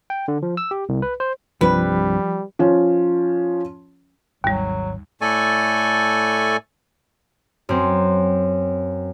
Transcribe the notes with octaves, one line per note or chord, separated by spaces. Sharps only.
G5
D3
F3
E6
G4
C2
B4
C5
C2 G2 C3 F3 G3 B4
F3 C#4
G#1 D#2 F#3 G3
A2 A3 A4 D5 G#5 C#6
F#2 C4